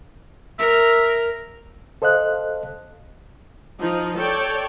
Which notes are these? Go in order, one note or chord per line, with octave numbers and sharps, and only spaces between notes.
A#4 E5
A4 C5 D#5 F5 F#6
F3 D#4
A4 C#5 D5 G5